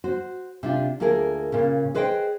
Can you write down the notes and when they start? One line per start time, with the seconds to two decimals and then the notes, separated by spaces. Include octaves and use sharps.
0.04 F#4 C5
0.63 C3 D4 F4
1.00 D2 A#3 F4 G#4 A#4
1.52 A#2 C#3
1.95 G#4 B4 C5 D#5 F#5 G5